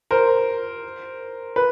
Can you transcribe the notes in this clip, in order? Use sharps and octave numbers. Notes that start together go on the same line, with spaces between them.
A#4 C5
B4